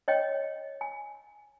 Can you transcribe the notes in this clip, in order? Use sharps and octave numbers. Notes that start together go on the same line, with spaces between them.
C#5 D#5 G5
G#5